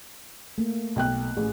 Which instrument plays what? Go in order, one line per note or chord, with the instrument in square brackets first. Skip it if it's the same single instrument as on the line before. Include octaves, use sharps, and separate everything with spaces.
[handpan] A3 A#3
[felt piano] B1 G5 F#6
[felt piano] A1 [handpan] G#4